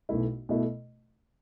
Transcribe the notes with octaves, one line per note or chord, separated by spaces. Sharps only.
B1 B2 A3 E4
B2 A3 E4